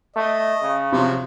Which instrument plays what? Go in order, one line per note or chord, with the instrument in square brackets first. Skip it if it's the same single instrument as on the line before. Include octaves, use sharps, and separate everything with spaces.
[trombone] A3 [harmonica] D#5
[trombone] C#3
[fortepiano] C3 [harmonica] F3 F#3